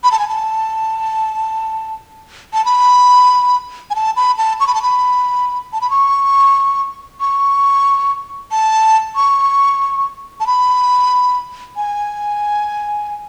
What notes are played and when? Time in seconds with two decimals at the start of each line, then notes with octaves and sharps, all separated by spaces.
0.04 B5
0.12 A5
0.19 G#5
0.28 A5
2.53 A5
2.65 B5
3.90 G#5
3.95 A5
4.16 B5
4.38 A5
4.60 C#6
4.67 B5
4.74 A5
4.82 B5
5.73 A5
5.81 B5
5.90 C#6
7.20 C#6
8.51 A5
9.16 C#6
10.40 A5
10.47 B5
11.76 G#5